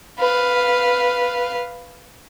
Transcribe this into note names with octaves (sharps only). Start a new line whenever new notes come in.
B4 F5